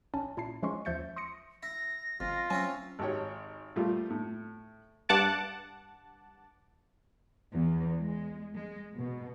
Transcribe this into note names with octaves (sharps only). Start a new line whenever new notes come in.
A#1 C#4 A5
A#2 E4 A5 C7
F3 G#3 C#4 C6 C#6
D#2 F3 E5 G6 A6 C#7
C6 D#6 A#6 C#7
E4 A#6
G1 F2 F4
F#3 C4 C#4 E4 G#5
G#1 F#4 G4 C#5
A#2 F3 G3 A3 F4
A2
G2 F#5 A5 D6 A6
E2
G#3
G#3
B2